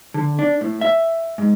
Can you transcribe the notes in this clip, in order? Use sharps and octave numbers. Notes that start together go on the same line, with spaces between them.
D3
D4
A2
E5
G#2